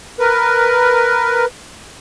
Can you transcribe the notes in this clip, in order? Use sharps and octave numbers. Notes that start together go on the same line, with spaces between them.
A#4 B4